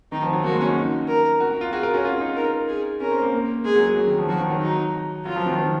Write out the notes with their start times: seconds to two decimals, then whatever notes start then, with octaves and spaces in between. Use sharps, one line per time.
0.12 D#3 D#4
0.22 F3
0.33 F#3
0.44 A#3 F#4
0.52 G#3
0.60 C#4
0.68 D#4
1.08 A#4
1.40 F#4
1.51 F#4
1.61 F4
1.72 F#4 G#4
1.83 A#4
1.94 C#4
2.04 F4 G#4
2.20 D#4
2.36 A#4
2.68 G#4
3.00 C#4 A#4
3.11 C4
3.22 A#3
3.65 G#3 G#4
3.75 F#3
3.86 G#3
3.96 F#3
4.07 D#3
4.18 F3
4.29 F3 F#4
4.40 D#3
4.50 F#3
4.61 D#4
5.25 F#3 F4
5.36 F3
5.46 D#3
5.57 F3